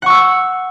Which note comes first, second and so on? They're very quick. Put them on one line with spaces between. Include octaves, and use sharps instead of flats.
F#5 C#6 E6